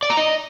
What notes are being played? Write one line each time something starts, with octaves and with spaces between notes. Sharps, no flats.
D5
A#5
D#5